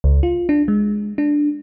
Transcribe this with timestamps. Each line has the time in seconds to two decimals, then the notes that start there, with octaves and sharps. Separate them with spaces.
0.04 C#2
0.23 F4
0.49 D4
0.68 G#3
1.18 D4